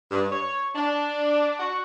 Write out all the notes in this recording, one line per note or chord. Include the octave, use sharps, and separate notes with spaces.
G2
C#5
D4
F#4